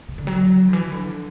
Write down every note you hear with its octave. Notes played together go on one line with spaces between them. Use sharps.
C#3
D3
F#3
D3
E3
D3